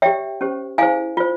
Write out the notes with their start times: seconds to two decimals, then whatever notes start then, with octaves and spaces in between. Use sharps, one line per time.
0.02 G4 C#5 E5 G5
0.41 C#4 G4 C5
0.78 E4 G#4 C5 F5 G#5
1.17 F4 C5